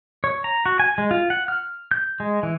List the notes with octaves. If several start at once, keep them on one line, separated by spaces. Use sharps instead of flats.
C#5
A#5
F#4
G#5
G#3
F4
F#5
F6
G6
G#3
E3